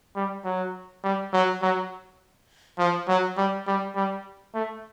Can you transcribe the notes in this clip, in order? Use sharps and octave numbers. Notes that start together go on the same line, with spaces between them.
G3
F#3
G3
F#3
F#3
F3
F#3
G3
G3
G3
A3